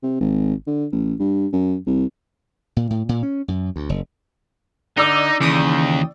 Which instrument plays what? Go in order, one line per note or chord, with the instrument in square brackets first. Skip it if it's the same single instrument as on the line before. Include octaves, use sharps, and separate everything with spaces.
[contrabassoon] C3
G#1
D3
A1
G2
F#2
C2
[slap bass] A#2
A2
A#2
C#4
F#2
D2
F#1
[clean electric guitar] D3 [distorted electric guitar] D#4 [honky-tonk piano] D5 D6 E6
[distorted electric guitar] D#2 [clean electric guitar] C#3 [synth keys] E3 G5 D#6